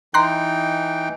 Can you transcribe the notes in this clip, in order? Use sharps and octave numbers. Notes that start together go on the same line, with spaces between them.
E3 D#4 G5 A#5 C6 F#6